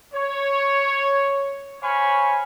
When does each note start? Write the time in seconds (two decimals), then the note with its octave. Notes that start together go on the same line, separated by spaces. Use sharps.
0.14 C#5
1.82 C5 C#5 F5 G#5 B5 C#6